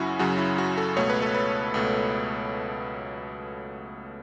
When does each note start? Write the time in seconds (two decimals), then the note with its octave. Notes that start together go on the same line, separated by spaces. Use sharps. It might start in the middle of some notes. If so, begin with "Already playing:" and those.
Already playing: F#2 C#3 F#3 C#4 E4 F#4
0.19 F#2 C#3 F#3 C#4 F#4
0.38 E4
0.58 F#4
0.77 A4
0.97 C#2 B2 A3 C#5
1.10 B4
1.22 A4
1.34 B4
1.74 C#2 B2 A3